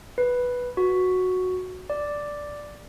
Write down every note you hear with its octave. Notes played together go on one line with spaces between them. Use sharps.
B4
F#4
D5